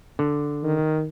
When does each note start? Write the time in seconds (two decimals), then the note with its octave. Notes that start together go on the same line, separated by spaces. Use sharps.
0.19 D3
0.63 D#3